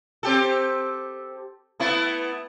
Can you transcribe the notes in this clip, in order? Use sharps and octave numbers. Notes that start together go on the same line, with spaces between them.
C4 G4 A4
A3 B3 E4